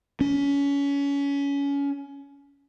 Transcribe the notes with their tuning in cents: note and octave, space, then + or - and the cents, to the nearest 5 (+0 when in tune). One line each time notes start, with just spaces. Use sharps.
C#4 +25